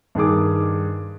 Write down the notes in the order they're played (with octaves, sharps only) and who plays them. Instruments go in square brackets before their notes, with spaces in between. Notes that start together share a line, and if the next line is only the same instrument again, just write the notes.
[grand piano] G2 D#3 G#4 D6